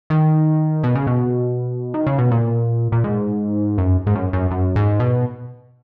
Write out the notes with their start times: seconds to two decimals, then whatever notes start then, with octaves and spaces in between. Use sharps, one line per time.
0.10 D#3
0.83 B2
0.95 C#3
1.07 B2
1.94 D#3
2.07 C#3
2.18 B2
2.31 A#2
2.92 A#2
3.04 G#2
3.78 F#2
4.06 G#2
4.15 F#2
4.33 F#2
4.51 F#2
4.76 G#2
5.00 B2